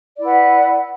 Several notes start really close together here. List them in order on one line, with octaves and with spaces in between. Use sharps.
D5 E4 B4 F#5